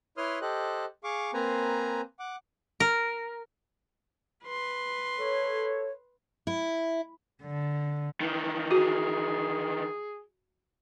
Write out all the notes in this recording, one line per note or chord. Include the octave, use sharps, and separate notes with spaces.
E4 B4 C#5 C6 D#6 F6
G4 A4 C5 D#5 F#6
G#4 F5 C#6 D6
A#3 C4 B4 C5 G#5 A#5
F#5 D6
A#4
B4 C6
A4 C#5
E4
D3
D#3 E3
F#4 G#4